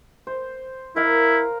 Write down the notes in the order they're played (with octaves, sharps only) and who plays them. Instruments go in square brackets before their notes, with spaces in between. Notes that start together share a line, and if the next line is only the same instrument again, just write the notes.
[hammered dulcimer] C5
[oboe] E4 [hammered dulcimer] A#4 F5 A#5